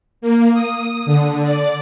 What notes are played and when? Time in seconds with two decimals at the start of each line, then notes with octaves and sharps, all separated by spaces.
0.21 A#3
0.54 D#6
1.06 D3
1.44 D5